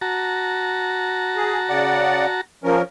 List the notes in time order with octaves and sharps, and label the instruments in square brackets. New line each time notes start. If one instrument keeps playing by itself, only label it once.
[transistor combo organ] F#4 A5 A#5
[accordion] G#4
C#3 D5 F#5
F3 C#4 A#4